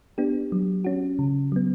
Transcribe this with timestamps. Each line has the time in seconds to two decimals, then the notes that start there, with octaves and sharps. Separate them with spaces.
0.18 B3 D4 G4
0.52 F#3
0.84 C#4 F#4
1.19 C#3
1.52 F#3 B3